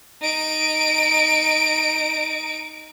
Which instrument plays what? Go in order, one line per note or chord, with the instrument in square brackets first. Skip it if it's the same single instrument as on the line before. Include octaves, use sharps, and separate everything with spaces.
[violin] D#4 D7